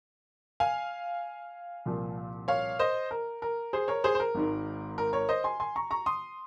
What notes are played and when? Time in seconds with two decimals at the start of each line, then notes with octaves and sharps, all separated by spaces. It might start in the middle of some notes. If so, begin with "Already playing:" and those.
0.60 F5 G#5
1.85 C2 A#2 F3
2.48 C#5 F5
2.79 C5 D#5
3.11 A#4
3.42 A#4
3.73 G#4 C5
3.88 A#4 C#5
4.04 G#4 C5
4.15 C5
4.20 A#4
4.35 G#1 G#2 D#3
4.98 A#4
5.13 A#4 C#5
5.29 C5 D#5
5.44 G#5 C6
5.60 G#5 C6
5.76 A#5 C#6
5.91 A#5 C#6
6.06 C6 D#6